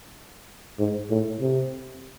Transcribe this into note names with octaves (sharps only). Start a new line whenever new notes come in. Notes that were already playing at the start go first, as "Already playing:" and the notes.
G#2
A2
C3